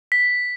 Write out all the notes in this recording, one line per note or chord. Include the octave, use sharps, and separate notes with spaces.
B6